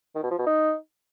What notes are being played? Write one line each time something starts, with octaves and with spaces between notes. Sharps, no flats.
D#3
B2
F3
B2
D#4